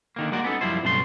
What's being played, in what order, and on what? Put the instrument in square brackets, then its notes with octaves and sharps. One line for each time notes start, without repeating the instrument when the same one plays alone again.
[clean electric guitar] D3 D#3 A#3
G#3 A#3 F#4 D5
B3 C#4 D#4 A4
F#2 F3 G3 E4 C5
B1 G2 C#3 A3 C5 C6